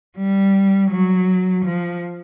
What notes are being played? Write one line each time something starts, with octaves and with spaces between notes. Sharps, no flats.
G3
F#3
F3